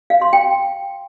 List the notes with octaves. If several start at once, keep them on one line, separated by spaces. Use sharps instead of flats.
F5
C6
G5